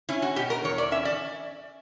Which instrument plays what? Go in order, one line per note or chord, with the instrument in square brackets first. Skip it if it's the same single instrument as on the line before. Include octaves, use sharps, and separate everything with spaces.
[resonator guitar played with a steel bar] C#4 E4
F#4
B2 G4
A#4
E2 C#5
D5
C#4 E5
D5